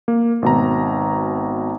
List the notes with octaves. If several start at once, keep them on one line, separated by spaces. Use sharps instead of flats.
A#3
G#1 B2 A#5